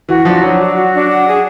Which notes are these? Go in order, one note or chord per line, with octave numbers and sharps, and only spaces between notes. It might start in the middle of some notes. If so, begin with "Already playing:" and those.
E3 F#4
F3 D4
F#3 D4
F#4
F#4
D4
F#5
G#4